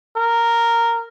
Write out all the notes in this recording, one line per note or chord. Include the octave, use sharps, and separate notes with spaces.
A#4